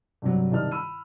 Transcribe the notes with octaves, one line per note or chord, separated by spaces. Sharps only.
G2 C3 F#3
C2 C3 D#3 D#5 A5 F6
B5 E6 D#7